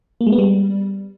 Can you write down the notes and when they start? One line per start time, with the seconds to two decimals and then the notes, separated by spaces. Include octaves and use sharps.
0.21 A#3
0.26 G#3
0.32 B3
0.38 G3